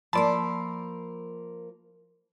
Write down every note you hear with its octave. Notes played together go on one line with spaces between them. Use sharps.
F3 A#3 A#4 D5 A5 B5 C6 E6